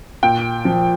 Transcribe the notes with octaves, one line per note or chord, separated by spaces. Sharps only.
A#2 G5
F3